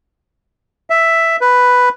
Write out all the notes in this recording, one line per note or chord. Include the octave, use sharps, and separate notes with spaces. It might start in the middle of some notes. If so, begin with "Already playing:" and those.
E5
B4